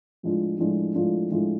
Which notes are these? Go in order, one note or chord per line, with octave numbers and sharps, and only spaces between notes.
A2 F3 G#3 D4 F4
A2 F3 G#3 D4 F4
A2 F3 G#3 D4 F4
A2 F3 G#3 D4 F4